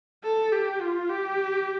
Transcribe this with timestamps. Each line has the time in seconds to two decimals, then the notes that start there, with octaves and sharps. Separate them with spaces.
0.23 A4
0.52 G4
0.81 F4
1.09 G4